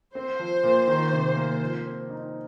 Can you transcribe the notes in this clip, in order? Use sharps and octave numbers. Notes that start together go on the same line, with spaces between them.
C4 C5
F3
A#2
D#3
C3
A#3
F3
C4
D#4